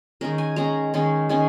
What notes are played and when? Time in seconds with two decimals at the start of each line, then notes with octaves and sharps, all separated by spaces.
0.21 D#3 G#3 C#4 A#4
0.38 G#5
0.56 D#3 G#3 C#4 A#5
0.94 D#3 G#3 C#4
1.29 D#3 G#3 C#4